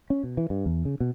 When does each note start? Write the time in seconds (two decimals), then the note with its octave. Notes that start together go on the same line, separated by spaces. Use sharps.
0.10 C#4
0.24 B2
0.37 E3
0.50 G2
0.66 E2
0.85 C#3
1.00 B2